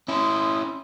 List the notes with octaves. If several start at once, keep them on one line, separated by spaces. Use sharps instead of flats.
C#4 E4 C6 D#6